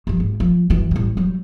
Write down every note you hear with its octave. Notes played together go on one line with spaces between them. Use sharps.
G2 F3
G#1
F3
F#2 E3
A1 G3
F#3 G3